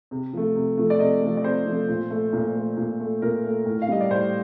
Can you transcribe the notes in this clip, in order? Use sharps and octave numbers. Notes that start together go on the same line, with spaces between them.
C3
F3 A3
C3
F3 A3
D5
C3 D#5
F3 A3
D5
C3 C5
F3 A3
A#2
A3
A#2
A3
A#2
A3
A#2 A#4
A3
A2
F5
G3 D#5
D5
A2 C5